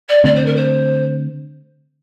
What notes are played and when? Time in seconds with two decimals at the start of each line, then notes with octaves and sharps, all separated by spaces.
0.09 D5
0.24 D3 A3 C4 D5
0.34 C5
0.45 A#4
0.55 C5